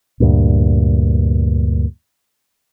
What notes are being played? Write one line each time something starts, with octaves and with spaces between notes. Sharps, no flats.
D2 G2 A#2